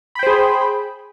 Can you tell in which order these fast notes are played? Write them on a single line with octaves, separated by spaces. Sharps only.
B5 G5 C5 G#4